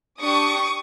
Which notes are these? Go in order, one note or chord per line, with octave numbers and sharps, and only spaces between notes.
D4 G4 C#6 D#6